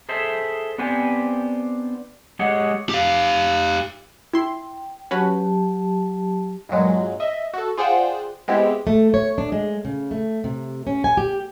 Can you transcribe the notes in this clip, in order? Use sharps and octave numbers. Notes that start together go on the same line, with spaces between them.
G#4 A4 C5 E5
B3 C4 D4 G4 C5 G#5
G#3 G4 G#4 C#5 F#5
G4 F5
E4 G5 C6
F#3 C#4 F#4 G4 B4 A5
G2 A#2 F#3 G#3
D#5 E5
F#4 A4
F4 G#4 C5 D5 F#5 G5
G#3 B3 C4 E4 G4
A3
C#5
D4
G#3
C#3
A3
C3
C#4
G#5
G4